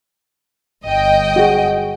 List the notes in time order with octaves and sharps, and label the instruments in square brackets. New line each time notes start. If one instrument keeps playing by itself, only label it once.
[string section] G1 D#5 G5
[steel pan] F#4 G#4